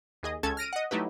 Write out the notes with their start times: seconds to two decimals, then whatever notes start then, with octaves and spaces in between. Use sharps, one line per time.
0.23 D#2 G#4 D#5
0.43 C#2 C#4 A4 A5 G#6
0.57 F6 A#6 D7 D#7
0.73 D#5 F#5
0.91 F#3 A3 D#4 E4 G4 B4